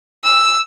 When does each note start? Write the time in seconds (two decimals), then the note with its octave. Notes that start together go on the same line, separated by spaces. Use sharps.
0.24 E6